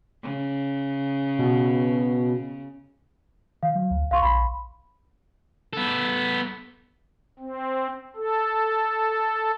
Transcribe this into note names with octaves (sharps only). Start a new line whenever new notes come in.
C#3
B2
D#3 F5
F#3
D2
C2 F5 C6 C#6
A#1 B5
B3 A4
C4
A4